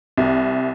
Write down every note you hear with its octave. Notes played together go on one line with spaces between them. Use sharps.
C2